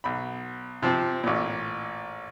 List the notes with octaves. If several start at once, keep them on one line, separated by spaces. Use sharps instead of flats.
B1 B5
C3 F3 C4
A1 A#2